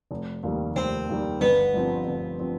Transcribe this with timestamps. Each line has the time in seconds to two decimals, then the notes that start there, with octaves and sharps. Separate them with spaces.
0.11 F1
0.43 D#2 D#3 G3
0.76 F1 C4
1.09 D#2 D#3 G3
1.41 G1 B3
1.74 G2 F3 C4
2.07 G1
2.40 F3 C4